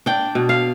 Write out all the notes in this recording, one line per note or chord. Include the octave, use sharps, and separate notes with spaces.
D4 G5
B2
F5